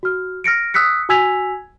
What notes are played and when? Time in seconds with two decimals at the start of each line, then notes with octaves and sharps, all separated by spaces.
0.03 F#4 F6
0.44 F6 A#6 C#7 D7
0.74 D#6 E6 F#6 B6 C#7
1.09 F#4 G#5 E6 G#6 B6 F7